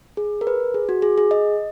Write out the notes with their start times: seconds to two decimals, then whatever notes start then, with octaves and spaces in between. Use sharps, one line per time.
0.17 G#4
0.41 A#4
0.47 B4
0.74 G#4
0.89 F#4
1.02 G#4
1.18 G#4
1.31 D#5